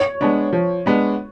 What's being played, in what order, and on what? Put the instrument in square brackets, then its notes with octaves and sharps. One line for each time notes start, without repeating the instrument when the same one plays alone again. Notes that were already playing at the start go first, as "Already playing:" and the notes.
Already playing: [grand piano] C#5
[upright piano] G#3 B3 D4
F3
G#3 B3 D4